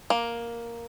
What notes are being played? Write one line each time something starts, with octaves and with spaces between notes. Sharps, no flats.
A#3